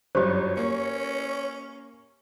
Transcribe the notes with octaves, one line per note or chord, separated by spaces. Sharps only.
G1 F#2 G4 C5 C#5
A#3 C#4